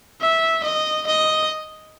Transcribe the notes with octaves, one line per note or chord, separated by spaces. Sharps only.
E5
D#5
D#5